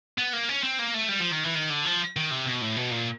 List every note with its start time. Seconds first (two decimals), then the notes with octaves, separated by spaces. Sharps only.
0.18 B3
0.33 A#3
0.49 C#4
0.63 C4
0.79 A#3
0.94 A3
1.09 G3
1.20 F3
1.32 D#3
1.44 E3
1.55 D#3
1.70 D3
1.85 F3
2.16 D#3
2.31 C3
2.46 B2
2.61 A2
2.77 B2
2.91 A#2